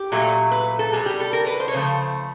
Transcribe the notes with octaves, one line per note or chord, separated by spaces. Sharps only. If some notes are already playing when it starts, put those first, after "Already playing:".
Already playing: G4
A#2 F#3 A3
B4
A4
B2 G3 G#4
G4
A4
A#4
B4
C5
C#5
C#3 F3 A3 C5